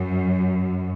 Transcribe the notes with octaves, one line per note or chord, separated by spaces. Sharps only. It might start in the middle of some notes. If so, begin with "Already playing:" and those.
Already playing: F#2